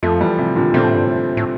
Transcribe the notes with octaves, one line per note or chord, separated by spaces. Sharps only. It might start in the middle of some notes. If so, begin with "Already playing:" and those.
F2 F3 A3
E3 G3
C3
A#2 D3
A#2 A3 C4
A2
G2
A2
A2